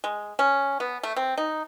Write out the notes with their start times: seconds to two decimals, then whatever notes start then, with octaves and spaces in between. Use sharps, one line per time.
0.04 G#3
0.39 C#4
0.80 B3
1.03 A3
1.16 C4
1.38 D#4